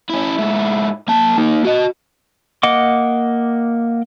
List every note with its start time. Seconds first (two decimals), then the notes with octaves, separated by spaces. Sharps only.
0.10 C#4 E4
0.38 G#2 E4
1.08 A#3 A5
1.38 A#3 D#4
1.65 F#4 D#5
2.63 A#3 D#5 F#5 D6